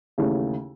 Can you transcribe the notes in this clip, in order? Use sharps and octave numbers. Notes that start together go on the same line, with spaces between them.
D#2 C#3 E3 A3 C#4